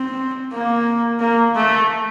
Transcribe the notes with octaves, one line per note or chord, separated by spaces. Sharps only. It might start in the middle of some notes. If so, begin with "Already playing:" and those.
Already playing: C4
A#3
A#3
A3